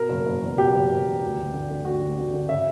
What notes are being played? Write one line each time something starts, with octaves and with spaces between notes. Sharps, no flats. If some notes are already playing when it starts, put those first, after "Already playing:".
Already playing: B2 A#4
F#1
F#1
E2
B2 G4
F#1
F#1
E2
D2
D2
D3
D3
D2 F#4
D2
D3
D3
C#3 E5